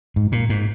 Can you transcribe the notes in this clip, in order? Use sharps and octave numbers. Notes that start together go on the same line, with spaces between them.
G#2
A#2
G#2